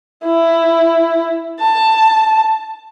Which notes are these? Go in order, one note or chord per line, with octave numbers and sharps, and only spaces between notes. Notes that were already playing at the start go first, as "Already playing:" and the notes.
E4
A5